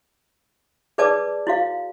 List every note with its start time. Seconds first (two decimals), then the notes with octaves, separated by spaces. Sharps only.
0.98 G#4 B4 D5 A5 D6 D#6
1.47 E4 F#4 F5